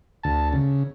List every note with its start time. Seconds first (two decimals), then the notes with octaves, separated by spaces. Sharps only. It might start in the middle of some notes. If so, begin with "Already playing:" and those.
0.23 D2 A5
0.53 C#3